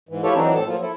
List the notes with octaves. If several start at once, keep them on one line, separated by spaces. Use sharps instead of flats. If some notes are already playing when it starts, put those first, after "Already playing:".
G#2 E3
E4 F4 G4 A4 C#5
E3 F#3 C4 D4 D#4
A2 A4 A5
F3 F#3 A#3 F4
E4 A4